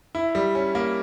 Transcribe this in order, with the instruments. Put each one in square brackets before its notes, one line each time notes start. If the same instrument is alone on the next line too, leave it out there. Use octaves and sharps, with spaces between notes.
[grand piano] E4
G3
C#4
A#3